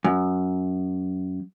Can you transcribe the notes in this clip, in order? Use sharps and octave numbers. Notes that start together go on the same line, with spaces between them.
F#2